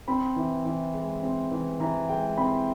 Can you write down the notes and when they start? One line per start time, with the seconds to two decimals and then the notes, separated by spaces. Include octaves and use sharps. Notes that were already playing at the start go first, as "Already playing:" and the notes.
0.08 C4 B5
0.36 E3
0.65 E3
0.94 G#3
1.22 C4
1.51 E3
1.80 E3 A#5
2.09 G#3 G5
2.37 C4 B5